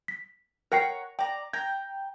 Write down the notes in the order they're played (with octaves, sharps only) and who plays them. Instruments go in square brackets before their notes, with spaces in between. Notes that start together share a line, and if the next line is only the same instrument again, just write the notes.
[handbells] B6
[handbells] A#4 G5 C7 [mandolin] C#5 F#5 A#5
[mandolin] D5 A#5 [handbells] G5
[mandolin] G5 A#5 [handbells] G#6